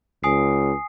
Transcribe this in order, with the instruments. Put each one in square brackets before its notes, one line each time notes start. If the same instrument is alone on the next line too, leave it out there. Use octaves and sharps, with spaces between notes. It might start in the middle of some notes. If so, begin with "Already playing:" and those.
[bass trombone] C#2 [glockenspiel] G#5 D#6 C7